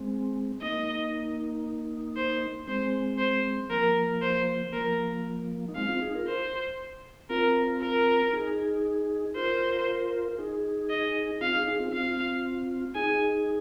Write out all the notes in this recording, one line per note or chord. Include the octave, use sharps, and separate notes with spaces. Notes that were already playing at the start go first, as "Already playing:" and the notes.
Already playing: G#3 C4
A#3 D#4 D#5
C5
G#3 C4 C5
C5
F3 A#3 A#4
C5
F3 A#3 A#4
D#4
G#3 C4 F5
C4 F4
D#4 G#4
F4 A#4
C5
C4 F4 A#4
A#4
D#4 G#4
F4 A#4 C5
D#4 G#4
D#5
C4 F4 F5
D#4 G#4
D#4 G#4
C4 F4
C4 F4 F5
D#4 G#4 G#5